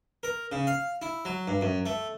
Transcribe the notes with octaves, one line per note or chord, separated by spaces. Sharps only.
A#4
C#3
F5
E4
F#3
G2
F#2
A3